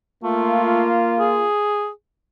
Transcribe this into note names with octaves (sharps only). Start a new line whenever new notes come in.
A3 A#3 F4
G#4